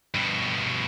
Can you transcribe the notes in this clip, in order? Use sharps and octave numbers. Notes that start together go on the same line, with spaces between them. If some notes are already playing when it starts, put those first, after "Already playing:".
G2 B2